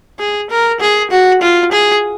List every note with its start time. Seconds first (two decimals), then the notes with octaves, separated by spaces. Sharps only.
0.19 G#4
0.50 A#4
0.81 G#4
1.11 F#4
1.42 F4
1.72 G#4